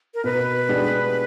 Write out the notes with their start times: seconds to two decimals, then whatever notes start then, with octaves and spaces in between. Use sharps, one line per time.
0.14 A#4
0.24 B2 B4
0.69 G#3 B3 D4 G4